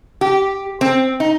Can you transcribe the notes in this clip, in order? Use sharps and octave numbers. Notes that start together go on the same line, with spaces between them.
G4
C4
D#4